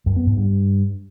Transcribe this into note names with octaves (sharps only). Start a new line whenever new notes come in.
F#2
B3
G#2
G2